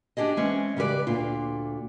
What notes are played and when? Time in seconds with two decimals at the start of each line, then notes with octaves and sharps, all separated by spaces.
0.17 D4 D#4 G4 G#4 D#5
0.37 E3 G#3 C4 C#4
0.77 C#3 G3 G4 B4 D5
1.07 D2 A#2 D4 F4